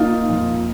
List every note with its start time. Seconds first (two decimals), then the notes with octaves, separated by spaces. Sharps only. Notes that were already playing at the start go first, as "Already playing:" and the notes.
Already playing: A#3 D#4 F4
0.29 F2